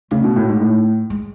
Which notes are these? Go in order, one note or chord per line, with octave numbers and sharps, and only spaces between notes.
C#3 A3
B2
A2
G#2
A2
G#3